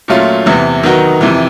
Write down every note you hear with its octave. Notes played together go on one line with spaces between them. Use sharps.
A#2 F#3 A3 C#4 F4
E2 C3 E3
D#3 F#3 B3 D#4 F#4
F2 C3 E3